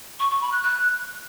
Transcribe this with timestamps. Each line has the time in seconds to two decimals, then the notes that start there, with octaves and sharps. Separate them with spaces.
0.19 C#6
0.30 C#6
0.41 B5
0.52 F#6
0.62 F#6